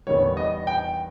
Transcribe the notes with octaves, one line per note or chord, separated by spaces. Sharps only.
E2 D#3 G3 C#5
D#5
G5